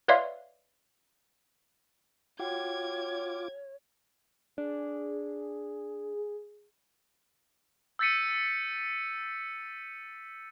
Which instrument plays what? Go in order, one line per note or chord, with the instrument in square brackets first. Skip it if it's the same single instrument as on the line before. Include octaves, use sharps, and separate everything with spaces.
[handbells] B4 C#5 D5 E5 F5 C6
[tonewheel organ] F4 D6 [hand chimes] F#4 F#5 G5 [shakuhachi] C#5 [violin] G#6
[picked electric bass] D4 [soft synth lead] G#4
[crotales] E6 G6 A6 B6 C#7 D#7